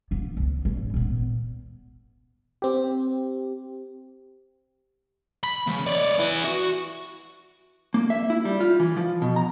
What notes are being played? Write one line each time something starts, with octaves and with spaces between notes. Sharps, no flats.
A#3 B3
C#2
G#1
A#2 B3
C4 G4
B5
D#2 C#3
C#5 D5
B3 E4
F#4
A#3
E5
E4
G3
F4
E3
F3
B2
A#5